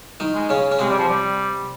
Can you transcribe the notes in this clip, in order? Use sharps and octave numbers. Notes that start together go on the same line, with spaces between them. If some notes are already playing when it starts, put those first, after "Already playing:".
D#3 D#4
G#3
C#3 C#4
C#4
C3 G#3 C4
G3
F3
G3